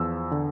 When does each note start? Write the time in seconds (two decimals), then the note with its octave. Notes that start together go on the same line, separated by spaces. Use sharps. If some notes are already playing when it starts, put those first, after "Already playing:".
Already playing: E2 F3 E6
0.31 D3